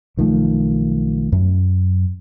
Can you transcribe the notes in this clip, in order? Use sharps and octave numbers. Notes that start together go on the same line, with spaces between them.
B1 D#3 F3 A3
F#2